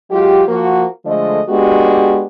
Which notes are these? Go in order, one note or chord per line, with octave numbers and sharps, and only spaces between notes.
F#3 G#3 F4 G4
F3 A#3 F#4
D3 F3 G#3 A3 D#5
G#3 B3 D4 F#4 G4